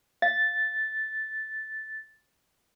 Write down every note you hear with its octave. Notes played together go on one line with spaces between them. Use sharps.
F5 A6